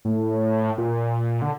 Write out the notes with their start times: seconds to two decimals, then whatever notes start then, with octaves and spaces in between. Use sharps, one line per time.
0.05 A2
0.78 A#2
1.42 D3